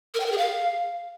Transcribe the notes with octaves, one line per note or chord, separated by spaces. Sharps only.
A#4
G5
A#4
G#4
F5